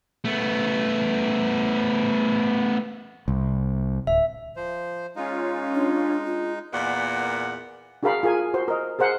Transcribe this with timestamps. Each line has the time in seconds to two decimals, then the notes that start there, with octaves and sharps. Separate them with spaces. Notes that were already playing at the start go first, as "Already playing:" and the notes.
0.25 A3 B3
3.28 C2
4.07 D1 E5
4.56 F3 C5
5.16 G#3 C#4 D#4 F4
5.75 D4
6.26 F4
6.73 E2 A#2 A#3 B3 D5 F#5
8.03 D4 F#4 G#4 A#4 F5 B5
8.23 F4 G#4 A#4 G#5
8.54 F#4 C5
8.68 A#4 D#5
8.99 G#4 A#4 C5 F#5